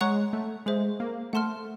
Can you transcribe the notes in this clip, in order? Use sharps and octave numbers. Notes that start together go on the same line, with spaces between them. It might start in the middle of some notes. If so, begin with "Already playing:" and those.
G#3 C#5 F#5 A#5 C#6 F#6
A3
G#3 G#4 C5 E5
A#3
A3 F#5 A5 C6 F6